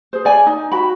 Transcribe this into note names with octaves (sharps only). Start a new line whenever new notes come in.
G#4 C5
D5 G#5
D#4
F#4 G5 B5